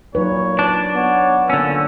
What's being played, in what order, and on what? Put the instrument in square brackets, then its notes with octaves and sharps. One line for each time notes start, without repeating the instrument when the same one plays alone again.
[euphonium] A#2 [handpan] F#3 D#4 B4 [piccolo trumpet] C#5
[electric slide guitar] D4
[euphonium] B3 [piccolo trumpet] C#5
[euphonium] A#2 [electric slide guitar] D3 C#4 [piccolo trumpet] E6